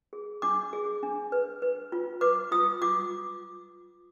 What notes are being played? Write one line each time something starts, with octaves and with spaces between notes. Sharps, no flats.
G#4
D4 D6
G#4
D4
B4
B4
F4
B4 D6
F4 D#6
F4 D6